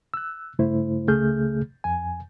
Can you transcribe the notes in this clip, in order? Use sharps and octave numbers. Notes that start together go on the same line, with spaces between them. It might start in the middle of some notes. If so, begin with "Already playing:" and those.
E6 F#6
G2 C#3 A3 E4 C5
C#2 C#3 A3 G#4 F6 G6
F2 G#5